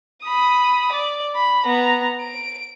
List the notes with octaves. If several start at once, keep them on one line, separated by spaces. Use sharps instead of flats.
B5 D#6
D5
B5
B3 A#5
D7